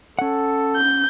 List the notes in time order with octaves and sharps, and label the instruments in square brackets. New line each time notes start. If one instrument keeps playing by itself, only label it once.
[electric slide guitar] C#4 F#5 [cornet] A4
[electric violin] G6